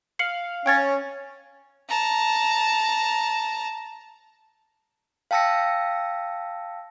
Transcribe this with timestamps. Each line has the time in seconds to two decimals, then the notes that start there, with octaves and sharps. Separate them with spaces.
0.19 F5 C7 C#7 F#7
0.66 C#4 G5 G#6 A6
1.89 A5 A#5
5.31 F5 G5 A5 E6 A#6 C#7